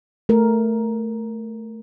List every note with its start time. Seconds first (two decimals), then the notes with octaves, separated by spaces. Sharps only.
0.29 A3 A#4